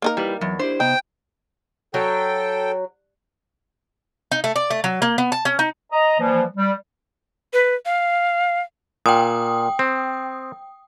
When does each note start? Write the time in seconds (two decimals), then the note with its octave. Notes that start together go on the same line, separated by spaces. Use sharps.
0.02 A#3 D#4 A#4
0.17 G3 E4 G4 B4
0.41 E2 F#3
0.59 D4 E4 G4 C5
0.80 C3 B3 D#4 G5
1.94 F#3 A4 G5
4.32 D#4
4.44 A3
4.56 D5
4.70 A3
4.84 F#3
5.02 A#3
5.18 B3
5.32 A5
5.45 C#4
5.59 D#4
5.92 D#5 A#5
6.20 E3 F3 G3 A#3
6.57 G3
7.53 B4
7.86 F5
9.06 A#2 G5 D#6
9.79 C4